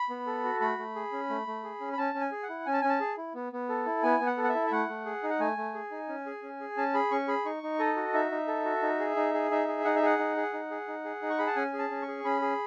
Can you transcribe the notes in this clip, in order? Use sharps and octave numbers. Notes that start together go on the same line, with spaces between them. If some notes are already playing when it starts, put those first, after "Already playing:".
Already playing: B5
B3
A4
F#4
A3 B5
A3
G#4
C#4
A3
A3
G#4
C#4
B5
C#4 A5
C#4
G#5
G#4
F#5
E4
C#4 G#5
A5
C#4 G#5
A5
G#4
E4
B3
B3
A4
E4
B3 G#5
B3
F#5
A4
F#5
E5
E4
E5
A3 F#5
A3
G#4
D#4
F#5
A3 G#5
A3
G#4
D#4
C#4
G#4
C#4
G#4
C#4 A5
G#4 B5
C#4 C#6
G#4 B5
D#4 C#6
D#4
A4 D#5
F#4
D#4 E5
D#4
A4
F#4
D#4
G#4
D#4
G#4
D#4 E5
G#4
D#4 F#5
E5
G#4 F#5
D#4
G#4
D#4
G#4
D#4
G#4
D#4
C#6
G#4 B5
A5
C#4 G#5
G#4
A5
C#4
C#6
G#4
C#4 B5
G#4